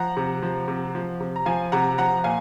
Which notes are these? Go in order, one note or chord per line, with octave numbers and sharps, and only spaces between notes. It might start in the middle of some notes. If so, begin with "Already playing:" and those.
Already playing: F3 F#5 A#5
C3
F3
C3
F3
C3
A#5
F3 F5 G#5
C3 F#5 A#5
F3 F#5 A#5
A#2 F5 G#5